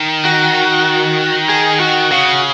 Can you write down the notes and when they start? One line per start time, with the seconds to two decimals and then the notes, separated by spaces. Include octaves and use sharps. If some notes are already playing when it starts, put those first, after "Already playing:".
Already playing: D#3
0.25 F#4
1.49 G#4
1.80 F#4
2.11 C#3 F#4